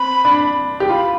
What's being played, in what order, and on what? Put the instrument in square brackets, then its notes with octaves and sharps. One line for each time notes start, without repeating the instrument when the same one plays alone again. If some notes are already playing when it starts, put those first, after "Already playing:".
Already playing: [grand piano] C4 [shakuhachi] B5
[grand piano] D4
G4
[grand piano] F4 [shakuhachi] B5